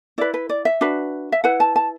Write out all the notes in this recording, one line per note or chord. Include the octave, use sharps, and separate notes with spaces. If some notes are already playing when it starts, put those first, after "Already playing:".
E4 B4 D5
B4
D5
E5
D4 F#4 B4
E5
E4 B4 F#5
A5
A5